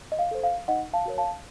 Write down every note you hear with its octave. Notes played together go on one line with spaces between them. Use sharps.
D#5
F5
A4 C5
F5
D#4 D#5 F#5
F5 A5
F#4 A#4 C#5
F5 A5